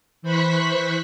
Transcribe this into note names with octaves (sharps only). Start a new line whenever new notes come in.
E3 C5 B5 C#6 F#6 B6